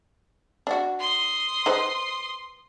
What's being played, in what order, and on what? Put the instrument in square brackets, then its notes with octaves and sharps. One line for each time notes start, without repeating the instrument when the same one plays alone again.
[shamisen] D4 F#4
[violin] C6 D#6
[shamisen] D#4 B4 C5